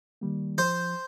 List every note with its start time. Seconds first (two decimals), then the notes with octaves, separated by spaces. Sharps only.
0.21 D#3 G3 A#3
0.58 F3 C5